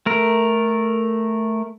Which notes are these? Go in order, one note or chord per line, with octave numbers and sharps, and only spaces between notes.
A3 A#4